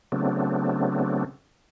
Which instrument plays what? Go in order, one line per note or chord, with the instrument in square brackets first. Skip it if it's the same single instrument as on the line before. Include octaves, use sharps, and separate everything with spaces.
[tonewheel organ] C#3 F#3 A3 B3 C4 D4